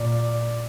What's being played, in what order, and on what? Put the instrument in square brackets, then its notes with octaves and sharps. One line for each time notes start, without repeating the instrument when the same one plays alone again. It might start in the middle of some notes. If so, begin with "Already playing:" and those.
Already playing: [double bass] A#2 [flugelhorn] D5